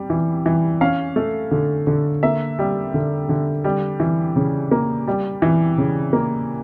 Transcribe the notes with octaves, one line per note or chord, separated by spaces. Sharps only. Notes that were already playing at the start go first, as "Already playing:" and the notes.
Already playing: G3
E3
E3
C#4 F5
A3
D3
D3
A#3 E5
G3
D3
D3
G3
E3
C#3
A#3
G3
E3
C#3
A#3